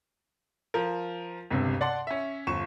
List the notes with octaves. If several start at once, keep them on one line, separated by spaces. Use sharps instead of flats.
F3 A#4
G1 C#2 G2 C3
D5 F#5 A5 C6
C#4 E5
G1 F3 C#6 E7